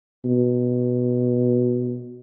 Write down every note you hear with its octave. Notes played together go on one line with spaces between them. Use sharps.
B2